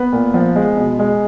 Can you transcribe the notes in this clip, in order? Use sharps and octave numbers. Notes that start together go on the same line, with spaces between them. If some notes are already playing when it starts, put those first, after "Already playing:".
Already playing: B3 B4
A#2
F3
G#3
B2
G#3